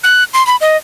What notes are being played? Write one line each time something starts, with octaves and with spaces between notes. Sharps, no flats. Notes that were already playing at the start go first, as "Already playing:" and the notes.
F#6
C6
B5
D#5